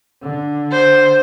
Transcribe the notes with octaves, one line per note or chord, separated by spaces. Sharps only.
D3
C5